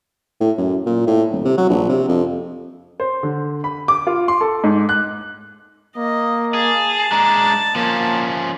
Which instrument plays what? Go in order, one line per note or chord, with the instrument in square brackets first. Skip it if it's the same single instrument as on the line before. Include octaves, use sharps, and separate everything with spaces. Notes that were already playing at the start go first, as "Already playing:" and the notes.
[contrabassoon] A2
F#2
A#2
A2
D#1
C3
F#3
A#1
C3
F2
[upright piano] C5
D3
B5
D6
F4
C6
A4
G#2
F#6
[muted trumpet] A#3 [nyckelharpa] D#5
[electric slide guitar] G#4 [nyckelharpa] A5
[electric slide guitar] G#3 D4 [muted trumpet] A#5
[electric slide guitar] F3 C#4 [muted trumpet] A#3